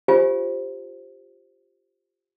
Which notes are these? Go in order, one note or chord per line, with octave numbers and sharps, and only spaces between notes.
F4 G4 C5 F5 G#5